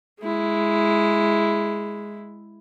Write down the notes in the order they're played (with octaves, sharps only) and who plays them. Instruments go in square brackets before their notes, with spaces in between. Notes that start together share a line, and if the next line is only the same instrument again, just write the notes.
[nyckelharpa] G#3 E4